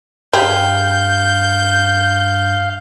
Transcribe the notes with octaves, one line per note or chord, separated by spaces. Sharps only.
G2 G4 G#4 F5 G6